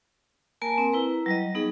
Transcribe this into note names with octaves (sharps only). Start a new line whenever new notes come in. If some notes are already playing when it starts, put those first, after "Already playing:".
A#3 A#4 G#5 A5
C4
E4 B4 A#5
F#3 G3 D#5
B3 D#4 G#4